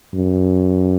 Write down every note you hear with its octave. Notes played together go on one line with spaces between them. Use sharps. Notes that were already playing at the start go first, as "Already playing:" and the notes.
F#2